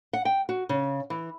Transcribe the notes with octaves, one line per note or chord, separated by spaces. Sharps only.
F#5
G5
F#4
C#3
E3